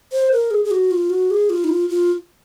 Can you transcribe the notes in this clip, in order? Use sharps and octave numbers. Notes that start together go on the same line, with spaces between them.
C5
A#4
G#4
G#4
F#4
F4
F#4
G#4
F4
D#4
F4
F4